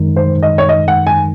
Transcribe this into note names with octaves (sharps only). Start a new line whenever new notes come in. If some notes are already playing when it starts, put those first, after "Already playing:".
Already playing: F#2 D#3 G#3 D#4 A#4
C5
D#5
C#5
D#5
F#5
G#5